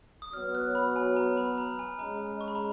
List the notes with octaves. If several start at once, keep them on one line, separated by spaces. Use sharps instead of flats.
D#6
F#3 B3 F#4 C#5 F6
F#6
B5
G#5
A#5
B5
A#5
G#5
G#3 C#4 G#4 D#5 A#5
C#6
B5
A#5